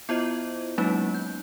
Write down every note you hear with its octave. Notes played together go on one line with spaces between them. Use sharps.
B3 E4 F4 C5 D#5
F#3 G#3 A#3 C#4 D#4
G6